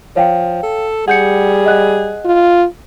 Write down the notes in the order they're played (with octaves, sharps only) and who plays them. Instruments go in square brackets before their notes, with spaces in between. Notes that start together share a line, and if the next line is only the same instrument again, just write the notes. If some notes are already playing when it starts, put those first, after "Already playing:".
[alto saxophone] F3 [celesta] C#5 F5 G5
[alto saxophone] A4
[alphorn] G3 [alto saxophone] G#4 [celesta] F#5 G6 C#7
[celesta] D#5 F#5 F#6
[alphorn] F4